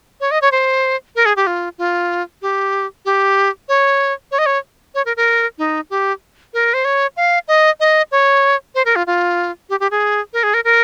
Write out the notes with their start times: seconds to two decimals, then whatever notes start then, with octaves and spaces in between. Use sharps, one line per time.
0.21 C#5
0.31 D#5
0.42 C#5
0.52 C5
1.16 A#4
1.26 G#4
1.36 G4
1.47 F4
1.78 F4
2.42 G4
3.05 G4
3.69 C#5
4.31 C#5
4.38 D#5
4.46 C#5
4.95 C#5
5.06 A#4
5.17 A#4
5.58 D#4
5.90 G4
6.54 A#4
6.74 C5
6.85 C#5
7.17 F5
7.48 D#5
7.80 D#5
8.11 C#5
8.75 C5
8.85 A#4
8.96 F4
9.07 F4
9.70 G4
9.80 G4
9.91 G#4
10.33 A#4
10.43 G#4
10.54 A#4
10.64 A#4